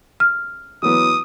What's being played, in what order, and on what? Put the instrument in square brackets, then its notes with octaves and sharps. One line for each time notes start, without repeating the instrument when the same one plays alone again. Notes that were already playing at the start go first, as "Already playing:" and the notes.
[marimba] F6
[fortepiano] E3 F#3 B3 [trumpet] D#6